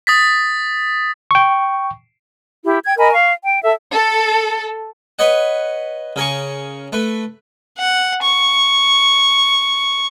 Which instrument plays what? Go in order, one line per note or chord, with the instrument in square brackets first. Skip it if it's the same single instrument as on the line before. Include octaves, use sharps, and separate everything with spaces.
[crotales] D#6 A6 B6
[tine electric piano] G5 C#6
[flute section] E4 G4
G5 G#6
A#4 D#5 G#5 B5
F5 C#6
G5
A4 E5
[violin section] A4
[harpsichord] B4 C#5 D#5 F#5
C#3 A#4 G#5 C#6
A3 B4
[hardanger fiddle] F#5
C#6